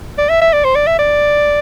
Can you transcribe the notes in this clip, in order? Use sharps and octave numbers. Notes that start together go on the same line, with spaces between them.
D5
E5
E5
D5
C5
D5
E5
D5